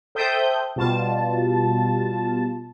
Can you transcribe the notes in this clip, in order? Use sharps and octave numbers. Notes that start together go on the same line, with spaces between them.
A4 C5 E5 G5 D#6 G6
B2 G3 F4 A5